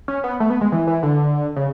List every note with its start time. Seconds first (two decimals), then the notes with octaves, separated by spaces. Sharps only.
0.08 C#4
0.24 B3
0.40 A3
0.50 B3
0.61 G#3
0.72 E3
0.87 E3
1.03 D3
1.56 C#3